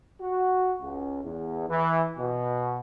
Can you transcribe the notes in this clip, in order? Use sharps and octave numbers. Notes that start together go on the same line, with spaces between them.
F#4
C#2
E2
E3
B2